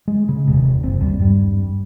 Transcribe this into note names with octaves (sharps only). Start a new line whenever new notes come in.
G#3
C#3
F1 D#2 C3
F#1 C4
G#1 D#2 G3
G2 G3